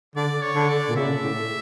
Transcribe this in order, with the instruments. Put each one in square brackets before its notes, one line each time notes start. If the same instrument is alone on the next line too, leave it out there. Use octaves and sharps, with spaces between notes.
[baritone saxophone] D3 [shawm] D5
[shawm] C#5
[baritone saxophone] D3
[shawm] D5
[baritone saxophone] A#2
[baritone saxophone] C#3 [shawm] E5
[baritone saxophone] A2